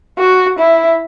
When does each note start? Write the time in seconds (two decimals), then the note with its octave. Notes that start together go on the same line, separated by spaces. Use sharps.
0.19 F#4
0.59 E4